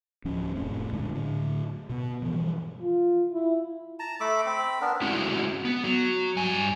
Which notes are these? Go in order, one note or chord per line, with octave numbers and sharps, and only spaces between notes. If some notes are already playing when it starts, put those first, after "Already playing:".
D1 F3 C#4
F1 A2 C4
C#2 A#2 D3 G#3
A2 D3
B2 B3
G2 B2 E3 F3
F4
E4
A5 A#5
A3 A4 B5 D6
C4 B5
B3 D4 A#4
G#3 C4 C#4 E4 F#4
B3
F#3
G2 G#5